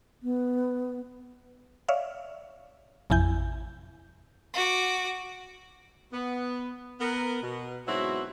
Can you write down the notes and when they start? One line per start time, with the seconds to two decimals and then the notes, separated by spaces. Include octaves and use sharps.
0.23 B3
1.88 C#5 D5 E5 F5
3.10 A1 F2 C3 E4 G#5 G6
4.54 F#4 D6
6.13 B3
7.00 B3 A#4
7.43 B2
7.87 G#2 B2 F#3 C4 E4 F#4